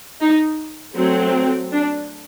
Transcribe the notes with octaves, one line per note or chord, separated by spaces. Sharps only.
D#4
F#3 A3 C4
D4